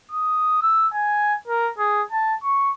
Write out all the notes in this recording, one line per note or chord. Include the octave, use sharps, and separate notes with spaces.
D#6
E6
G#5
A#4
G#4
A5
C#6